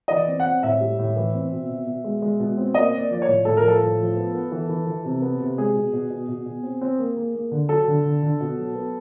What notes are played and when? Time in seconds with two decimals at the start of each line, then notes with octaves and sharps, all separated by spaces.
0.08 E3 D#5
0.16 D5
0.27 C4
0.40 F#5
0.45 C4
0.63 A2 E5
0.81 G3
0.99 A2
1.16 E3
1.34 C4
1.52 B2
1.69 B2
1.86 B2
2.04 G#3
2.22 G#3
2.40 B2
2.57 C4
2.74 A#3 D#5
2.93 A#3
2.98 D5
3.10 F3 D5
3.22 C#5
3.28 A2
3.45 A2 A4
3.57 A#4
3.63 F3
3.68 A4
3.81 A2
3.99 F3
4.16 B3
4.35 B3
4.52 E3
4.69 E3
4.86 E3
5.05 C3
5.22 B3
5.40 C3
5.58 G#3 G#4
5.75 B2
5.93 B2
6.10 B2
6.29 B2
6.46 B2
6.63 C4
6.81 C4
6.99 A#3
7.17 A#3
7.34 A#3
7.51 D3
7.69 F#3 A4
7.87 D3
8.05 D3
8.23 D3
8.40 B2
8.57 F#3
8.75 B3